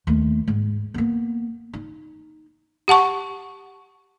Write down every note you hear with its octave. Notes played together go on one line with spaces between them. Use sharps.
D#2 A3
G#2
A#3 B3
D#4
G4 F#5 A5 C#6